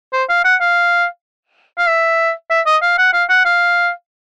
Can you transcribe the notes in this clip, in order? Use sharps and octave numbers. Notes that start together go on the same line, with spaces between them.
C5
F5
F#5
F5
F5
E5
E5
D#5
F5
F#5
F5
F#5
F5